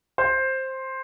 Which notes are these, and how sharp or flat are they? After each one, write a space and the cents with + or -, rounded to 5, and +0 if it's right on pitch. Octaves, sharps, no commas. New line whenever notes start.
C5 +10